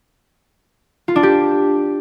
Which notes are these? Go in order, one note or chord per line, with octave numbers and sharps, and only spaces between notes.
F4
D4
G4